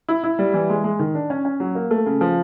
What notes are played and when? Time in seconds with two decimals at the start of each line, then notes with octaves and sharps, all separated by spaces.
0.08 E4
0.24 E4
0.39 G3
0.54 E3
0.70 G#3
0.84 G#3
0.99 D#3
1.15 D4
1.30 C#4
1.45 C#4
1.60 F#3
1.75 A#3
1.91 A3
2.06 C#3
2.21 F3